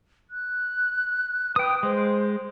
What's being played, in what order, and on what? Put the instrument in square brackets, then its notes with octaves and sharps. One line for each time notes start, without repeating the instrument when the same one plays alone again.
[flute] F#6
[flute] B4 [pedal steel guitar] G5 D#6
[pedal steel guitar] G#3 [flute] C5